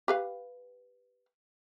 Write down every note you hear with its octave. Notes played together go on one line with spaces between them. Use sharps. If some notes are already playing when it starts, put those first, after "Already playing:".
G4 B4 F5